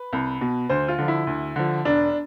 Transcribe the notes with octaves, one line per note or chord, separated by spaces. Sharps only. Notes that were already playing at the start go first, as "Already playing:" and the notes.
Already playing: B4
C2
B2
D2 C5
F4
D3 F3
E4
D2
D3 F3
E1 D4